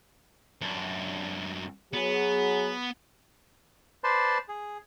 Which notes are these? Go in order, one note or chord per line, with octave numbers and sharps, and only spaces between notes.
F#2 D4
F#3 B3 G#4
B4 C5 D5 A5 C6
G#4